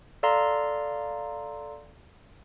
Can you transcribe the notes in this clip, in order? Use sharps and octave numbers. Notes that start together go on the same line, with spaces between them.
A4 D5 F5 A#5 C6